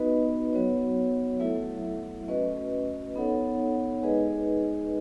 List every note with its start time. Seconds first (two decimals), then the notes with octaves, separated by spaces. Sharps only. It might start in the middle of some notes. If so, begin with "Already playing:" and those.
Already playing: B3 D#4 F#4 B4 D#5
0.53 F#3 B3 F#4 C#5
1.40 F#3 A3 E4 A4 E5
2.28 A3 C#4 F#4 B4 D#5
3.16 B3 D#4 A4 C#5 F#5
4.03 G#3 D#4 G#4 B4 D#5